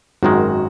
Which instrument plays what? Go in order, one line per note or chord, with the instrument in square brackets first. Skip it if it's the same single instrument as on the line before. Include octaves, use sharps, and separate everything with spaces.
[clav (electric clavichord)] G#1 F#2 D#3 G#3 [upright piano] F#4